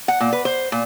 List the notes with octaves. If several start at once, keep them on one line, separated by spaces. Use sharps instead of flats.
F#5
A#2
B4
C5
A#2